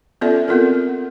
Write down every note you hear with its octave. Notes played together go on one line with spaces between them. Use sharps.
B3 C#4 F4 A4 D5 E5
B3 C4 F4 A4 A#4